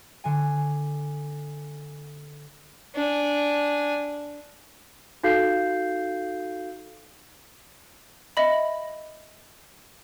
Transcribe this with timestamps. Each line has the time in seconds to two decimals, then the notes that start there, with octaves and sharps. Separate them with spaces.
0.24 D3 G#5
2.95 D4 G#5
5.23 D#4 F#4 A4 F5 G6 C7
8.37 D#5 E5 B5